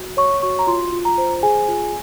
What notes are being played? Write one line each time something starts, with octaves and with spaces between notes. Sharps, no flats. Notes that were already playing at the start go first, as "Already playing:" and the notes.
Already playing: F#4
C#5 C#6
F#4 C#6
A#5
F4 C6
F4
A#5
C5
G#4 G#5
F4